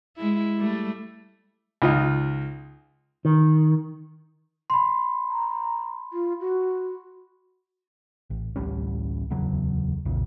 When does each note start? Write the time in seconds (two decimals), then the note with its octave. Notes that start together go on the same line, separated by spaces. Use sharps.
0.18 G#3 E4
0.57 G3 A3
1.82 C#2 D#4 F4 D#5
3.25 D#3
4.70 B5 C6
5.30 A#5
6.13 F4
6.40 F#4
8.30 A1
8.56 A1 D2 G3 C#4
9.30 D1 E2 C#3 F#3
10.05 A#1 E2 A#2 C#3